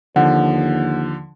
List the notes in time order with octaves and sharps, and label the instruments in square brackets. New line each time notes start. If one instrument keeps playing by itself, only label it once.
[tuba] D#2 [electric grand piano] D3 F3 [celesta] F#5